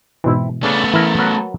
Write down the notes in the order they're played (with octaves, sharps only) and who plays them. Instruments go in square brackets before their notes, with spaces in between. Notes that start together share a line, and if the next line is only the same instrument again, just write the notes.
[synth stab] G#2 B2 E3 [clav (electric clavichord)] C4 E4
[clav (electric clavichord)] C#3 D4 [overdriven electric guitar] A3 B3
[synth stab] E3 [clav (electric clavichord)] E4 A#4 A#5
[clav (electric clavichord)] F#3 A#4 B4